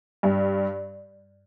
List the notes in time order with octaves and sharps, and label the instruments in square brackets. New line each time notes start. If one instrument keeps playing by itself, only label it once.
[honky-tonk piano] G2